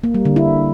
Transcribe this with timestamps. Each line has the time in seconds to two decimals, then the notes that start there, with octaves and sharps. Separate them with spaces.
0.04 A#3
0.14 G3
0.25 D3
0.36 E4